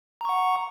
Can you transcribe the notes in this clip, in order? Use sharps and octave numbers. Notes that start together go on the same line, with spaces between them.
F#5 A#5 C#6